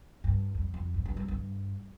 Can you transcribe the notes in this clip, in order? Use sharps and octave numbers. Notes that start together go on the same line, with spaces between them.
G2
F2
F2
G#2
G2
F2
G2